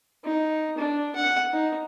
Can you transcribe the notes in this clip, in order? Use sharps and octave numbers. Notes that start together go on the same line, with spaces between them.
D#4
D4
F#5
D#4